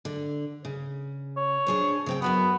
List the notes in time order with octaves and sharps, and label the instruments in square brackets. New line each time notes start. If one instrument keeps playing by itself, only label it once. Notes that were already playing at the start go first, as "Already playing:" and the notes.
[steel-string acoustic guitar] D3
C#3
[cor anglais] C#5
[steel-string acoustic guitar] D4 G#4 C5
C#3 C4 G5
[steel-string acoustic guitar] F#2 F#4 F#5 [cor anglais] B3